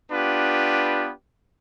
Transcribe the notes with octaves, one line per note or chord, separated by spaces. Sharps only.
B3 D4 F4 G4 B4